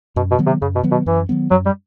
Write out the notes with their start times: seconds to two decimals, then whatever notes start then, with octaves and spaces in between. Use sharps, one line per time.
0.16 F#2 B2
0.31 B2
0.39 D#3 F#3 B3
0.47 C3
0.62 F#2 C#3
0.76 B2
0.83 D#3 F#3 B3
0.91 B2
1.06 F#2 E3
1.29 D#3 F#3 B3
1.51 F#2 F#3
1.66 G3